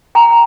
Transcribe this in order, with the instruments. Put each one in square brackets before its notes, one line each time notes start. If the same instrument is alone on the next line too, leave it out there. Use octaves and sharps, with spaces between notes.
[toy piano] G5 A#5